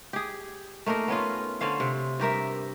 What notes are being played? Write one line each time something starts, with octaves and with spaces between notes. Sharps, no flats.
G4 G#4
A3 A#3 D#4 A#4
B3 C#4 F4
D3 C4 C#4 F5
C3
G2 G4 A#4 E5